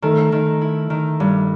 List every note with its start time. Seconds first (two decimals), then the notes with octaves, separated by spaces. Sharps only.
0.02 D#3 A3
0.32 D#3
0.61 E4
0.90 D#3
1.20 G2